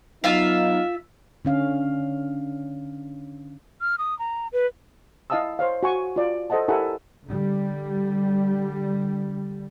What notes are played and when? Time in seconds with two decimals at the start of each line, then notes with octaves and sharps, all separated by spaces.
0.24 F#3 B3 D#4 F4 E5 F5
1.45 D3 C#4 F5
3.81 F6
3.98 D#6
4.19 A#5
4.53 B4
5.30 E4 D#5 F5 A5 D#6 E6
5.59 C5 C#5 F5
5.83 F#4 G#5 C#6
6.16 F4 D5
6.50 A4 C5 D#5 F#5 A5
6.68 E4 G4 A4 A#4 F#5 G#5
7.26 D3 G3